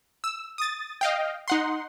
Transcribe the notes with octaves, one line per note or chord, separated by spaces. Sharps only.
E6
D#6 A6
D#5 F5 G5
D#4 F#5 C6